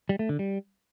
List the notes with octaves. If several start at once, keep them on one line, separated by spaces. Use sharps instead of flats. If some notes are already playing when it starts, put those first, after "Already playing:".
G3
A3
D3
G3